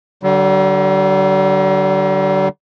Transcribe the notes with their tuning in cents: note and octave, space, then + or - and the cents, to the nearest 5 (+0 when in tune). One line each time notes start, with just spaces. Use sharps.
D3 +0 G3 -45